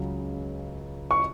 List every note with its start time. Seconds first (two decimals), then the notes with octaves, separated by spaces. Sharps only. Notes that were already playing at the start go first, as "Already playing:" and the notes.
Already playing: C#2 C#3 F#3
1.11 C#6